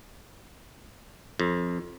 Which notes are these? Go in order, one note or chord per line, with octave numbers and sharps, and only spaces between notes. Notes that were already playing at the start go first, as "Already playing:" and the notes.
F2